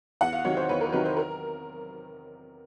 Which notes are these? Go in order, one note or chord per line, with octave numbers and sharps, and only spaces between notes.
E2 F#5
F5
C3 D#3 F#3 C#5
C5
E2 B4
A#4
C3 D#3 F#3 B4
C5
A#4